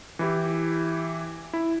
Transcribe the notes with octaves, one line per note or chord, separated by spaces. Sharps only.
E3 E4 G4
E4